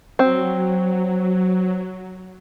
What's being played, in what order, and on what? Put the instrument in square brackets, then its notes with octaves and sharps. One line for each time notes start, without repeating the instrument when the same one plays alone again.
[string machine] F#3 [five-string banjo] C4